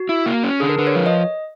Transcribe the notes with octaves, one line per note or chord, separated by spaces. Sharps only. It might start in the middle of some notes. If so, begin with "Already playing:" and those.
Already playing: F#4
E4
A#3
C#4
D3 G#4
A#4
D3 B4
C#5
F3
D#5